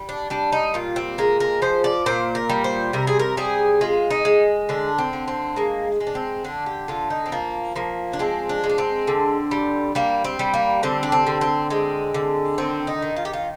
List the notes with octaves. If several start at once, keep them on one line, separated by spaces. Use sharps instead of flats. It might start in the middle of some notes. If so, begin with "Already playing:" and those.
Already playing: G3
D4
G3 D4
D#4
A#2 F4
C4
G#3 A#4
A#4
F3 C5
D5
A#2 C5
A#4
G3
C5
C3 A#4
G#4
A#4
G3 G#4
G#3 F4
D#4
G#3
D3 D4
C4
D3
C4
G#3 A#3
G#3
D4
C4
D3 D4
G4
D3 F4
D#4
C4
F3 A#3
F3 A#3
D4
G#3 C4
D4
G#3
D4
C4
D3
G3
G3 A#3
C4
G3
A#3
D3 C4
D4
C4
D3
C4
G#3 C4
D3
D#3 C4
D#4
D#3
F4
G4
F4